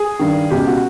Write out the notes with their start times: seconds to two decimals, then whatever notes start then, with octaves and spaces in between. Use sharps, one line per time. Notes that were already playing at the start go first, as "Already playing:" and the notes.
Already playing: G#4
0.19 G2 D#3
0.50 C#2 B2 G4
0.67 F#4